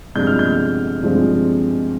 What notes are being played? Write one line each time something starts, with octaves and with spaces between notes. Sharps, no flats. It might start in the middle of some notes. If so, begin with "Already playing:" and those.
G2 F3 G#3 C4 G6
F6
G6
G2 F3 G#3 C4